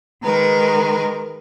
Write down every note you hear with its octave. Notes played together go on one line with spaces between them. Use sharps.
D#3 G#3 A#4 B4